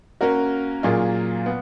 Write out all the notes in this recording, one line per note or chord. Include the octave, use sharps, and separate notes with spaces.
A#3 C#4 F#4 A#4
A#2 F#3 A#3 F4 G#4
B3